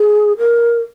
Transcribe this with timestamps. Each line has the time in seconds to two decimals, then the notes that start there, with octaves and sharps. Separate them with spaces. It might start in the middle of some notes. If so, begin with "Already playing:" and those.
Already playing: G#4
0.38 A#4